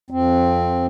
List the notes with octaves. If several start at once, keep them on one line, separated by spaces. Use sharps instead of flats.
F2 C4